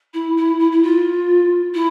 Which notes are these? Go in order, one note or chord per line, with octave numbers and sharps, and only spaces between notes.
E4
E4
E4
E4
F4
E4